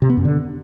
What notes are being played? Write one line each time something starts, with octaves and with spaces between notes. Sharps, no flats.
C3
B3
F#2
D3